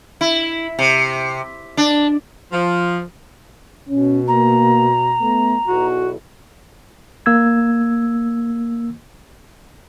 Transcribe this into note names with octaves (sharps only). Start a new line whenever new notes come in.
E4
C3
D4
F3
B2 C#4
A#3 A#5
A3 B3
B1 E2 B2 F#4
A#3 E6 G#6